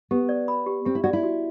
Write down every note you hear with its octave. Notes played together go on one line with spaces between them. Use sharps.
B3 G4
D5
B5
G4
C4 G4
E4
F#4 D5
E4
F#4